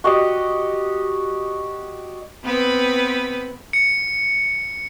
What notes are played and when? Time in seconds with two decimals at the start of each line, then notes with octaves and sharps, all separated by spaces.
0.04 F#4 G4 D5 D#5
2.44 B3 C4 B4
3.73 C#7